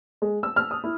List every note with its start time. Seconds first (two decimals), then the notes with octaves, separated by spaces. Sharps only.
0.22 G#3
0.43 E6
0.56 F6
0.71 D#6
0.84 E4